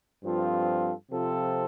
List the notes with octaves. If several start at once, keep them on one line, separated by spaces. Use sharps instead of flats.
G2 F3 C4 F4 A4
C3 F3 C4 F4 A4